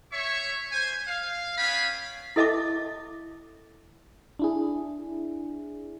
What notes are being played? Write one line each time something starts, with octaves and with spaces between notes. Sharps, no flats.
C#5 E5 C#6
C5 G#5
F5
B3 C#4 F5 G5 G#5 B5
E4 A4 D#5 E5 A5 D6
D4 E4 G#4